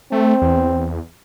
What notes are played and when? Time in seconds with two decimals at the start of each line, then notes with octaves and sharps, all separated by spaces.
0.12 A3 C4
0.42 E2